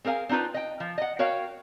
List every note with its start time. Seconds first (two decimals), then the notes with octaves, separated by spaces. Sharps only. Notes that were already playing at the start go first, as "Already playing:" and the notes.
0.05 C4 G#4 A#4 F5 G#5
0.29 C4 D4 D#4 F4 B4
0.54 D#5 G5
0.80 F3
0.98 D#5 F#5
1.19 F#4 A#4 C#5 F5 G5